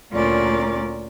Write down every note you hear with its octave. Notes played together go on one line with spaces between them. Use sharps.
D2 A#2 C#4 F4 A#4 D5